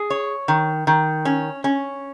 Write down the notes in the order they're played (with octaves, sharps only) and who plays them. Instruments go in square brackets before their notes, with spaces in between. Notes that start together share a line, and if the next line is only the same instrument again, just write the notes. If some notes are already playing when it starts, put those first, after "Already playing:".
Already playing: [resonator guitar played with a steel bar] G#4
C#5
D#3
D#3
C#4
C#4